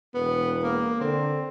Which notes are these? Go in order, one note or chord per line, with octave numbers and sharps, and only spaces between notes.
E1 B3
A#3
D3 C4